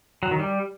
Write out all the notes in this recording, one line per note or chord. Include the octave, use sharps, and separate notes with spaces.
F#3
D#3
G3